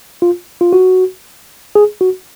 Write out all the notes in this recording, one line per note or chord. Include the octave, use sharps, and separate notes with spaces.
F4
F4
F#4
G#4
F#4